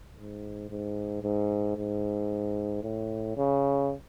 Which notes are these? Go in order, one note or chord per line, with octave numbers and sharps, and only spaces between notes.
G#2
G#2
G#2
G#2
A2
C#3